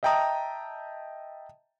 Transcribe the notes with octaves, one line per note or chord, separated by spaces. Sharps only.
D#5 E5 G5 A5 A#5 D#6